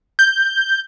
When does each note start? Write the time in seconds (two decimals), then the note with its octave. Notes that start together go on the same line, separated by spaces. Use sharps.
0.19 G6